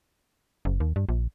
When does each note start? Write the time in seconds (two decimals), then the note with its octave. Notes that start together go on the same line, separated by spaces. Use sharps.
0.65 F#1
0.80 D#2
0.96 G2
1.09 A#1